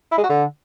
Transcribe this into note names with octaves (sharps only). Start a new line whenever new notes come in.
E4
G#3
F#4
D3